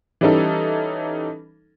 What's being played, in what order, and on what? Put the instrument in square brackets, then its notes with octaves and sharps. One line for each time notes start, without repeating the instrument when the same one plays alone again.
[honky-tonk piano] E3 G3 C#4 D#4 A4